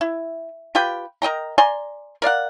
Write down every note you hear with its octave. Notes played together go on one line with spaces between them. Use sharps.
E4
F4 G4 B4 G5
A#4 D#5 G5 A#5
D5 G#5 A#5 C6
A#4 D5 F5 F#5